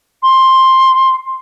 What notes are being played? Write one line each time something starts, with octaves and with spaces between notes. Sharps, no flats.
C6